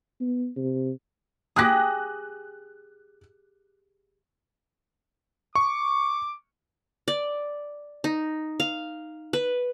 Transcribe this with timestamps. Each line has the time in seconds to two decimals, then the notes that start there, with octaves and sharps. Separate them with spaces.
0.21 B3
0.56 C3
1.56 G4 G#4 D#6 F#6 A#6
5.55 C#6 D6
7.08 D5
8.04 D#4
8.60 F5
9.33 B4